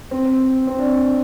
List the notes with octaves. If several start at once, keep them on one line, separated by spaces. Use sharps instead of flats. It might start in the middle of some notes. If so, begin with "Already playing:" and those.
C4
C4
D4